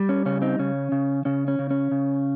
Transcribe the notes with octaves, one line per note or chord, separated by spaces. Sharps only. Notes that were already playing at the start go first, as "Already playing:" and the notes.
Already playing: G3
C#4
C#3 C#4
C4 D#4
C#3 C#4
C#3
C#3 C#4
C#4
C#3
C#4
C#3